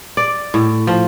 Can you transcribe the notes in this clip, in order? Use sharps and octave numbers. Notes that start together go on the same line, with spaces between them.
D5
A2
F3